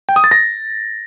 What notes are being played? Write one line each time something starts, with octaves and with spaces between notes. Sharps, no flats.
G5
D#6
A6
A#6